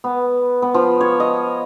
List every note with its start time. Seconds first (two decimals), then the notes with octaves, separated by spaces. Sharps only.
0.04 B3
0.62 B3
0.74 F3
1.01 C#5
1.20 D#5